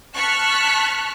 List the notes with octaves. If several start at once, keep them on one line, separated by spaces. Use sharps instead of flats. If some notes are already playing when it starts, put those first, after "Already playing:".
A5 C#6 F6 F#6 B6